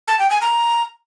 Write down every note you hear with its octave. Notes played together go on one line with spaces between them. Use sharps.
A5
G5
G#5
A#5